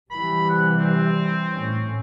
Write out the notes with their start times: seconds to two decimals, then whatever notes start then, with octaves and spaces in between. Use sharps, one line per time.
0.11 C3 E3 G3 B5
0.49 F#5
0.79 C4
1.53 A2 C#4